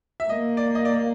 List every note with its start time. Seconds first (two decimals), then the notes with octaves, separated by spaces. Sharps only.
0.20 E5
0.29 A#3 D#5
0.57 D5
0.75 D#5
0.85 D5